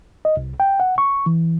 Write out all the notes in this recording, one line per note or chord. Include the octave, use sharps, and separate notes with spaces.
D#5
C2
G5
F#5
C#6
E3